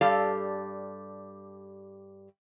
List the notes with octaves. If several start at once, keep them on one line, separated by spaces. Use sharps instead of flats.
G2 G3 G4 A4 D5 F5